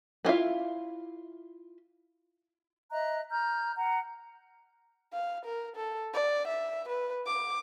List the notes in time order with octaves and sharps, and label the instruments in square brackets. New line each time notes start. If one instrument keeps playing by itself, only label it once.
[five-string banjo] B3 E4 F4 E5 F5
[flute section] D#5 E5 A#5 F#6
A#5 F6 G6
F#5 A#5
[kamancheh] F5
A#4
A4
D5
E5
B4
D6